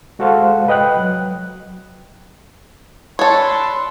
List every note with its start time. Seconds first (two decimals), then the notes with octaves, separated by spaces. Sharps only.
0.19 G#3 F#4 A4 C5 F5 F#5
0.68 B4 D#5 G5 F#6
0.97 F#3
3.19 D4 A4 B4 C#5 C6